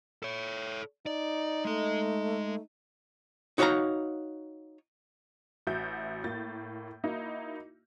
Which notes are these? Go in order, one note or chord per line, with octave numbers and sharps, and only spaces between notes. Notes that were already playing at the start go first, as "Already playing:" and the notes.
A4 C#5
D#4 D5
G#3 A3 D#5
D#4 F#4 C#5 D5 F5 A#5
A1 F#4 E5 G6
A2 A#3 G6 A6
A#3 D#4 E4 F#4